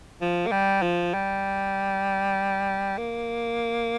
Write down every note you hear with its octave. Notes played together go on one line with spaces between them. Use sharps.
F3
A#3
G3
F3
G3
A#3